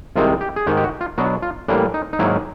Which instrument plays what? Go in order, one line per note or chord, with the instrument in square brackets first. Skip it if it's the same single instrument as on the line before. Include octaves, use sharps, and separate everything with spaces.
[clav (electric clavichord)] C2 C3 D#3 G#3 C4 F4
G4
G#4
G#2 D#3 G#3 G4
G4
F#4
F4
B2 F#3 B3 D4 F#4
F4
A2 E3 G3 A#3 D4
D#4
D#4
G#2 D#3 F#3 A#3 E4